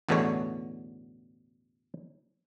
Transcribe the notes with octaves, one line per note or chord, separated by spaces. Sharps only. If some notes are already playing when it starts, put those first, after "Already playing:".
A1 E2 B2 D3 A3 C#5